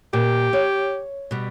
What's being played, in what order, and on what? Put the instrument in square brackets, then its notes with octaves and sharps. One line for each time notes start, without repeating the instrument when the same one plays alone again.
[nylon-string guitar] A#2 [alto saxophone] G4
[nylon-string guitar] C#5
B2 G3